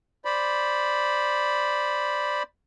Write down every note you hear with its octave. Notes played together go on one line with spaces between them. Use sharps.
C5 D5 B5